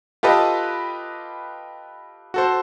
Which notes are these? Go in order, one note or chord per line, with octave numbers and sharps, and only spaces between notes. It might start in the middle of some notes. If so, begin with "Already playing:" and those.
F4 G4 A4 B4 D#5
F#4 A4 C5